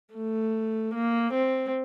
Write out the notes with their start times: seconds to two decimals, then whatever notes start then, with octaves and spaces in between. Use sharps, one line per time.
0.15 A3
0.95 A#3
1.33 C4